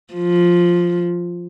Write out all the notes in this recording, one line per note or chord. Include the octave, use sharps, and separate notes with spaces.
F3